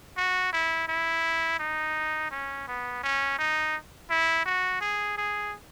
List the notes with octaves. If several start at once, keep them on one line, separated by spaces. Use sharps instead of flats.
F#4
E4
E4
D#4
C#4
B3
C#4
D#4
E4
F#4
G#4
G#4